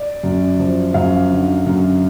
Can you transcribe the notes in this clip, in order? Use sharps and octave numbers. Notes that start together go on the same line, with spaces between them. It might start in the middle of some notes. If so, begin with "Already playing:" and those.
Already playing: D5
F#2
F3
F#2 F5
D3
F#2